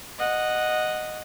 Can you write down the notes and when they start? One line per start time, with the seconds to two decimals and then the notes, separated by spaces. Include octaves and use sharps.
0.19 D#5 F#5